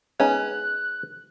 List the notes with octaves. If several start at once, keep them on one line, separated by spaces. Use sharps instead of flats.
G#3 B3 C#4 D#4 C#5 F#6